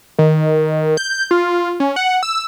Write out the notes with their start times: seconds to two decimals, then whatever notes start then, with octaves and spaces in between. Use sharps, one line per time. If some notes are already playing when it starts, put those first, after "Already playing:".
0.19 D#3
0.97 G6
1.31 F4
1.80 C#4
1.96 F#5
2.23 E6